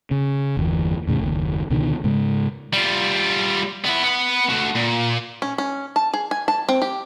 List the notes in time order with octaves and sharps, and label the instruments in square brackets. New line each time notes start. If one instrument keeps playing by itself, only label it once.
[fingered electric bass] C#3
G1 E2 E3
E2 A2 C#3
F#1 D#2
C#2 B2 D3 D#3
G#2 C#3 G#3
[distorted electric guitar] G3 F4
B3 E4
B3 B5
A3 F#4
A#2
[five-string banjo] C#4
C#4
A5
G#4
G#5
A5
C4
G4